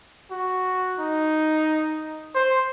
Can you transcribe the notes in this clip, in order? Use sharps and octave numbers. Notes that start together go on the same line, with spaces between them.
F#4
D#4
C5